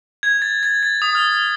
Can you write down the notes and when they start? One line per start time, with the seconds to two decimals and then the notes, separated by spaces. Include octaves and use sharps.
0.23 G#6
0.42 A6
0.63 A6
0.83 A6
1.02 D#6
1.15 F6